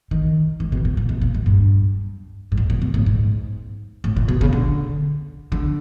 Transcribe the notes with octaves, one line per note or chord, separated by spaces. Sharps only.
D#3
D#3
B2
A#2
A#2
B2
A#2
G#2
G2
A2
G#2
A#2
B2
A2
G#2
A2
A#2
B2
C#3
D3
D3